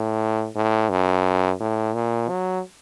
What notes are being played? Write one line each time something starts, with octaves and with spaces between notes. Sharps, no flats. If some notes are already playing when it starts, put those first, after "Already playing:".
Already playing: A2
A2
F#2
A2
A#2
F#3